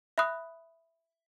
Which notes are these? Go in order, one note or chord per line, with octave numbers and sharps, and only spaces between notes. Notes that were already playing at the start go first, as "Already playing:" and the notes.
E5 B5 D#6 F#6